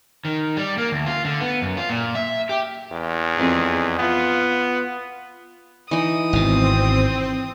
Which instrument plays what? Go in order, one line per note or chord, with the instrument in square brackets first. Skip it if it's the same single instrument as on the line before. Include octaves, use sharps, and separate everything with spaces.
[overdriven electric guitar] D#3
G3
A#3
D2
F4
D3
B3
F#2
F4
A#2
E5
G4
[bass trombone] E2
[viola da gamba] F2 C4 G#4
[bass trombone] B3 [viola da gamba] F4
[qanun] E3 D#4 [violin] D#6
[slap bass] G#1 B2 [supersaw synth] C4